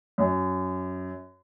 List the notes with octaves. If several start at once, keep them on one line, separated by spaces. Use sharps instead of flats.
F#2